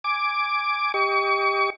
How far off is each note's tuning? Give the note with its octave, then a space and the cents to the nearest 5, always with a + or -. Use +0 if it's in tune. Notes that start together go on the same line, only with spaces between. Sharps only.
G#5 +0 D6 +0
G4 +15 D#5 +15 C#6 +40